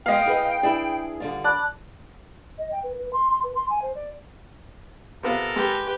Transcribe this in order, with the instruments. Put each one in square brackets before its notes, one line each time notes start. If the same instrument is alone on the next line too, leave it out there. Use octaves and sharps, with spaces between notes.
[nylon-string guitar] G#3 B3 [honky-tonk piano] D#5 F5 [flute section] G5
[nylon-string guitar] E4 G#4 B4
[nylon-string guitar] D4 E4 [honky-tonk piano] G#4
[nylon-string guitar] D3 G3 F4
[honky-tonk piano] D5 [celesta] A5 B5 F#6
[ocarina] D#5
G5
B4
B4
C6
C6
B4
C6
G#5
C5
D5
[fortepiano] C3 B3 F4 [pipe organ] A4 A#4
[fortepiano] G#3 [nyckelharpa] G4 B4